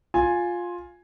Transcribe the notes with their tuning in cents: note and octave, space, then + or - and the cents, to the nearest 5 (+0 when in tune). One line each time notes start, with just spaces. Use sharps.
F4 +10 G#5 +0